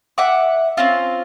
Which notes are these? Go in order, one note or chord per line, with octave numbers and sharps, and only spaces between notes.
E5 F#5 D6
C4 C#4 F4